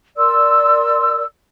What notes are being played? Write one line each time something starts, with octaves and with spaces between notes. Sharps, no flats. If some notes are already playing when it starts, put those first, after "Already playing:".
A#4 D5 C6 E6